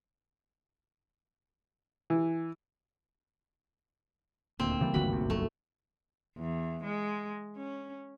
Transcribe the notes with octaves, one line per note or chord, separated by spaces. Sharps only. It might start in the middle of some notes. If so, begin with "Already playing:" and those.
E3
D#1 D2 A#2 C4
C#3 E3 G3
G1 D2 G#2 F#4 B5
C2 C3
F#1 C2 F#3 A3
E2
G#3
C#4